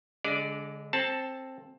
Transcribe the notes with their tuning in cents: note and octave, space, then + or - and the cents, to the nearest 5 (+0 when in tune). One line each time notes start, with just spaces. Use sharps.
D3 -35 G#3 +0 D5 +0
C4 +15 A4 +0 A5 +0